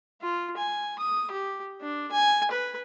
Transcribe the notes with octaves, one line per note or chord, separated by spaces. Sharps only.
F4
G#5
D#6
G4
D4
G#5
B4